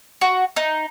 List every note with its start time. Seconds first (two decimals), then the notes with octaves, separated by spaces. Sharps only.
0.21 F#4
0.56 D#4